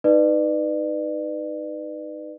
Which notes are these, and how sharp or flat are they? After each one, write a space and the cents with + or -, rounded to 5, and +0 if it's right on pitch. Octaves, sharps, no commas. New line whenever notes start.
D#4 +0 B4 +0 D5 +35